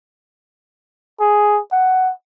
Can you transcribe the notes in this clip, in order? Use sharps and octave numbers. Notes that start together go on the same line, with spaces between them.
G#4
F#5